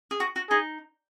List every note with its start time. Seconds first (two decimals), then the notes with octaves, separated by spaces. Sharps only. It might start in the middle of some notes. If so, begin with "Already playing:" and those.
0.11 G#4
0.20 F#4
0.36 F#4
0.50 D#4 G#4